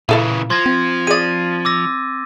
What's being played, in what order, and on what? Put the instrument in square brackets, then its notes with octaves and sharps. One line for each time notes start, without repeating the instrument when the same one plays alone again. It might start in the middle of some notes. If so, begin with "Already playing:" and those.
[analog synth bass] A#2 [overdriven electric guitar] C#3 E3 [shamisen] E4 A4 F5
[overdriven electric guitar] F3 [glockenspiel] C6 G#6 A#6
[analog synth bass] C4
[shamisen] G#4 D5 [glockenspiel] A6 D#7
[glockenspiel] D6 E6 A#6